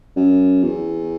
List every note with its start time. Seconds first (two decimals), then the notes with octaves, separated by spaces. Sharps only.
0.16 F#2
0.64 E2